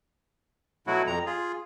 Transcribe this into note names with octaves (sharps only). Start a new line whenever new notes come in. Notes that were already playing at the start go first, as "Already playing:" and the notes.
B2 F#3 A3 E4 F#4
F2 A#5
F4 G#4